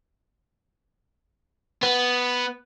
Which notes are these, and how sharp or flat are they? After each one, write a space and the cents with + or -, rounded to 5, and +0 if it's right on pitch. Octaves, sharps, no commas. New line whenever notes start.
B3 +0